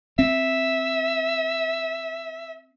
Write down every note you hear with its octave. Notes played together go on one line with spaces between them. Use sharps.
C4 E5